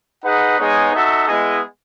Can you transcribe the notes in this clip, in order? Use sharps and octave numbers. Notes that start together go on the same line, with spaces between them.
D#4 G#4 B4 F#5
G#3 B3 D#4 G#4 C#5
D#4 F#4 A4 E5
G#3 B3 E4 G#4 D#5